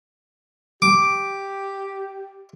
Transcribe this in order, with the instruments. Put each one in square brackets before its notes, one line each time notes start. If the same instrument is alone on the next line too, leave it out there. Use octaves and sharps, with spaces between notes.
[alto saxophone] G4 [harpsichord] D6